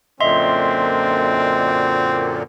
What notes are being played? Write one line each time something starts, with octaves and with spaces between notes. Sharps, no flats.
F#2 A#2 D3 C4 D#5 E5 C6